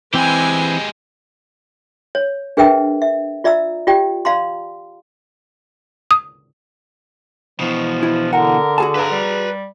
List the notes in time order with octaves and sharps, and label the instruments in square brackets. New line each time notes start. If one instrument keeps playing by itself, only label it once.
[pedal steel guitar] E3 C4 G5 [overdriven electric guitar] G#3 G4 [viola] B4 G#5
[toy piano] C#5
D4 G#4 A#4 B4 E5 G5
E5
F4 D5 E5 A#5 E6
F4 G4 D5 G5
D5 F5 A#5 C6
[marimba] D#6
[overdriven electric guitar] B2 E3 [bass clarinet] F3
[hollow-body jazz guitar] E4
[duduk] D3 [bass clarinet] A#4 [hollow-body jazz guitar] F#5
[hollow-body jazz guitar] F#4 G#4 A5
[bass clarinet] G2 [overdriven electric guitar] B4 A#5
[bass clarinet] G3